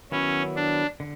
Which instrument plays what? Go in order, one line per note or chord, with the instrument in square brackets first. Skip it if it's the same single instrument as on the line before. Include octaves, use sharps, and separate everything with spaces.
[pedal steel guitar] D#3 F#3 B3 E4 [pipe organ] C#4
[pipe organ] D4
[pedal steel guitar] D3